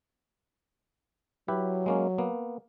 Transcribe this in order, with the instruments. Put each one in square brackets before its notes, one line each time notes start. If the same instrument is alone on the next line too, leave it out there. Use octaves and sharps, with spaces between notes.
[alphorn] F#3 [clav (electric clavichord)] E4 G4 B4
[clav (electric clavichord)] G#3 A#3 C#4
A#3 B3